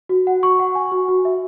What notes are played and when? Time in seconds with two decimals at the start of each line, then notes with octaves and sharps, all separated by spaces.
0.09 F#4
0.27 F#5
0.43 C#6
0.59 F#5
0.75 G#5
0.92 F#4
1.08 F#4
1.25 E5